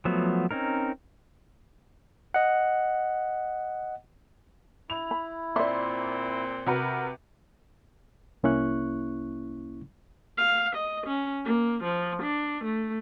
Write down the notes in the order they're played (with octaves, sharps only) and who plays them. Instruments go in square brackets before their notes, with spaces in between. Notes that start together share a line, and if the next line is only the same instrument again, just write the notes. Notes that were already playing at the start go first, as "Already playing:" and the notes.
[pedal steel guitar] F3 F#3 A3 B3
C4 C#4 D#4 A#4
[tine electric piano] D#5 F#5
[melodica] E4 [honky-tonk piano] F7
[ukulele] B5
[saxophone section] A#2 C4 [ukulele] D5 E5 [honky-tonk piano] C6
[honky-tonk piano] C3 F#4 B4 [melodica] A#4
[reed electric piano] C2 A#3 C#4 E4 C#6 F#6
[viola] F5
D#5
C#4
A#3
F3
D4
A3